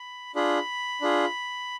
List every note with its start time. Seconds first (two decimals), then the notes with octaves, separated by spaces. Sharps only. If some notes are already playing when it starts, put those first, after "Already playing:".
Already playing: B5
0.35 D4 F4 G#4 B5
1.01 D4 F4 G#4